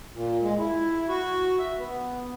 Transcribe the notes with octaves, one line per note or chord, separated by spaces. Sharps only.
A#2
G#3
E4
F#4
E5
B3